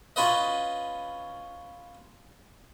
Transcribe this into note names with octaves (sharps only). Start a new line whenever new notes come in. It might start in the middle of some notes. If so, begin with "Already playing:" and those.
C#4 F4 B4 D#5